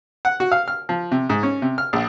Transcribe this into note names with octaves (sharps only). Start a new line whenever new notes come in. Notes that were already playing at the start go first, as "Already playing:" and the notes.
F#5
F#4
F5
F6
F3
C3
G#2
C#4
C3
F6
A#1